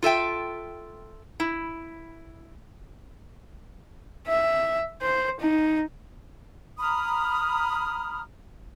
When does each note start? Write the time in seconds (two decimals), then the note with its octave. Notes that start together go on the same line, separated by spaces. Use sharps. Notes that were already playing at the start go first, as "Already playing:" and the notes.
0.03 F4 A4 E5 G5
1.40 E4
4.28 E5
5.02 C5
5.40 D#4
6.79 A#5 B5 D#6 F6